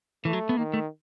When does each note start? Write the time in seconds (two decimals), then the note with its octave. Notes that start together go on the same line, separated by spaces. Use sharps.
0.25 E3 A3
0.33 F#3
0.49 B3
0.57 D#3 A#3
0.74 A3